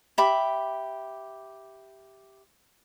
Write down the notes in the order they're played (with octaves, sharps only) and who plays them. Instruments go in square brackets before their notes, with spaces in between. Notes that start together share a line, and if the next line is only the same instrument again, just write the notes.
[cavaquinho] G4 E5 B5 D6